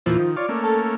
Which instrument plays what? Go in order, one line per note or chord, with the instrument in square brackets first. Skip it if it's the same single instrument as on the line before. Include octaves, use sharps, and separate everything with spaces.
[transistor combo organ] E2 A#2 E3 [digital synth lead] F3
[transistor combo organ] D#3
[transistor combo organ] F4 C#5 [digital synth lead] D5
[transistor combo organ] A3 A#3 C#4
[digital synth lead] A4